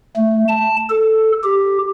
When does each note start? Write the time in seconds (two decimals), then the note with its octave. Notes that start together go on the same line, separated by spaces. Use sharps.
0.16 A3
0.48 A5
0.90 A4
1.43 G4